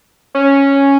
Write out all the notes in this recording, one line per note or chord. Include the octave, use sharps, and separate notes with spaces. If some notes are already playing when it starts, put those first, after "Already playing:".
C#4